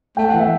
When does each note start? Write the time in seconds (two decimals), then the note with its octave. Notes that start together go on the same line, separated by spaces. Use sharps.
0.17 A3 G5
0.28 F#5
0.34 E3
0.40 E5